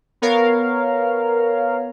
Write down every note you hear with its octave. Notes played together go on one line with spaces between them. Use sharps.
B3 A#4 C#5 F5